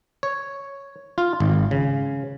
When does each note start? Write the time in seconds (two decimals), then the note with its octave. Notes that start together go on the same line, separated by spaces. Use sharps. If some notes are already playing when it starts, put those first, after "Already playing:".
0.23 C#5
1.18 F4
1.40 G#1
1.71 C#3